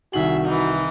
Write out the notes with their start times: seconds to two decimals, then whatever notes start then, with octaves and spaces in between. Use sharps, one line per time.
0.13 C2 D#3 F#4 G#4 E5 F#7
0.45 E3 D#4